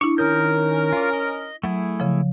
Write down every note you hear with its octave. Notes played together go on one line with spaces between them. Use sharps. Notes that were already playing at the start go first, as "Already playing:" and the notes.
D4 E4 C#6
D#3 C#4 A#4 D#6 G6
F4 D5
D#5
F#3 A3 E4 G#4
C#3 F3